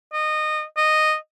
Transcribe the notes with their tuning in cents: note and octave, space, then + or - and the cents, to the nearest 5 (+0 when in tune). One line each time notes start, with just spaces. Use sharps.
D#5 -20
D#5 -10